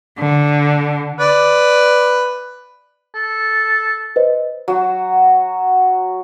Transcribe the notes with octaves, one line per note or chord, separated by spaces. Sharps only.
D3
B4 D5
A4
B4 C5 D#5
F#3 F#4